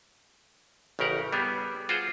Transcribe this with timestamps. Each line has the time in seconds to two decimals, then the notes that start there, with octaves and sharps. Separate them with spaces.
0.99 A1 C#3 G4 A#4 F#5
1.33 G3 B3 G#4
1.89 F4 F#4 G#4 C5